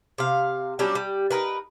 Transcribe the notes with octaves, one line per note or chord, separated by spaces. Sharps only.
C3 F5
F#3 G3 C#4 D4
G3
D#4 F4 A#4 B4